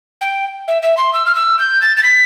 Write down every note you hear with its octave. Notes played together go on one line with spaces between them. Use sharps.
G5
E5
E5
C6
E6
F6
E6
G6
A6
A6
B6